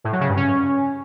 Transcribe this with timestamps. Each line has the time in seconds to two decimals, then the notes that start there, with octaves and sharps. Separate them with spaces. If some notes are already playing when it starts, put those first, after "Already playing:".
0.04 A2
0.12 F#3
0.20 C#3
0.28 G2
0.37 C#4